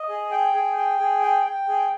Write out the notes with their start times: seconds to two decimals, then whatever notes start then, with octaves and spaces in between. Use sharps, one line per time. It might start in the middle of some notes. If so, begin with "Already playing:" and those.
Already playing: D#5
0.09 G#4
0.31 G5
0.54 G#4
0.76 G5
0.99 G#4
1.22 G5
1.45 G5
1.68 G#4